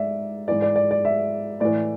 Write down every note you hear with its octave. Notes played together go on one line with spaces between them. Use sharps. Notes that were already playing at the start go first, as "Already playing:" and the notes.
Already playing: G#2 D5 E5
G#2 E3 D5
D5
D5
D5
E5
A2 E3 D5